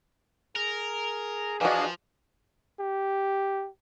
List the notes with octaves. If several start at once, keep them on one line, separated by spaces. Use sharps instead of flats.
G#4 A#4
E3 F3 D4 F#4 G#4 D#5 F5
G4